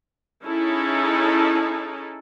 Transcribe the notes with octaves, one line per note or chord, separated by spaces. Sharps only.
C#4 D#4 E4 G#4 A4